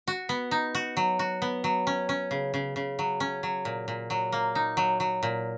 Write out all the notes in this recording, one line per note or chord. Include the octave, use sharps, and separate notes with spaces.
F#4
B3
D#4
F#4
F#3
F#4
B3
F#3
C#4
C#4
C#3
C#3
C#3
F#3
C#4
F#3
A#2
A#2
F#3
A#3
D#4
F#3
F#3
A#2